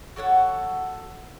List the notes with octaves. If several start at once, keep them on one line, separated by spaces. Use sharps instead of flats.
F#4 A4 C#5 F#5